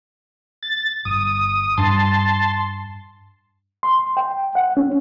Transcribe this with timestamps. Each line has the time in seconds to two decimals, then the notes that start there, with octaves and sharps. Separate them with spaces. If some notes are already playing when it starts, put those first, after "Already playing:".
0.63 A6
1.05 G1 D#6
1.78 G2 D4 A5 C6
3.83 C6
4.17 G5
4.55 F#5
4.77 C#4